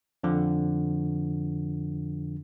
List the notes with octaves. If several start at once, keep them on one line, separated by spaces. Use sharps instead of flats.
F2 D3 F3